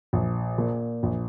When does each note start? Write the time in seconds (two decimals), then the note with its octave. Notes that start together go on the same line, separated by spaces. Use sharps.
0.13 A#1
0.58 A#2
1.03 A#1